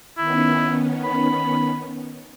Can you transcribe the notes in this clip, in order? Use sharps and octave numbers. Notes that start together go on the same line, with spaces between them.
D#3 B3 C#4 E4
B5